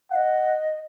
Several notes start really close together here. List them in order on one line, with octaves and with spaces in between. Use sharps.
F5 F#5 D#5